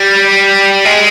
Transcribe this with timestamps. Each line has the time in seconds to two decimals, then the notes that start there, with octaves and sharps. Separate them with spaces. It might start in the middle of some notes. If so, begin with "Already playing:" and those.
Already playing: G3
0.85 G#3